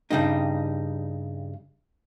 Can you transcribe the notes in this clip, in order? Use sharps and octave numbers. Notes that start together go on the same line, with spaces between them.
G2 C#3 G3 D#4